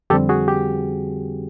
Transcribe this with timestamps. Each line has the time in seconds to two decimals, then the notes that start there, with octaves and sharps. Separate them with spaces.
0.10 F2 D3 G3 C4 G4 A4
0.29 F#4 G#4
0.48 G4